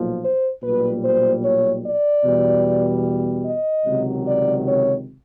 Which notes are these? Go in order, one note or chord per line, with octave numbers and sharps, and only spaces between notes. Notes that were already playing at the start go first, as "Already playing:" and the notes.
Already playing: B1 A#2 F3
C5
B1 A#2 G3 B4
C5
C#5
D5
E2 B2 G3
D#5
C#2 C3 D#3 F#3
D5
C#5